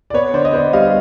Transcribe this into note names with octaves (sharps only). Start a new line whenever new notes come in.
D5
B3 B4 C#5
D3 C5 D5
D#5
B3 C5 D5
G3 D#5 F5